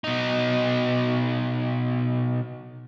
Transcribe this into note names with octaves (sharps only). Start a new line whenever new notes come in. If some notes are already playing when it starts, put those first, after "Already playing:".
B2 D#4